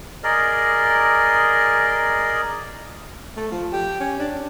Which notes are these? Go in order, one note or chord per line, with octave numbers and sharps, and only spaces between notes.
G#4 A#4 D5 D#5
A3
F3
G4
C#4
D4